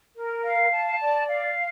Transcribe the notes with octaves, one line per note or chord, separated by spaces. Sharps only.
A#4
F5
A5
D5
F5